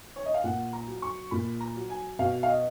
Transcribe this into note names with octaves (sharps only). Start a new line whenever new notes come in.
C#5
D#5
F5
A#2 F#5
A#5
F#3
C#6
A#2 B5
A#5
F#3
G#5
B2 F5
F5
D#5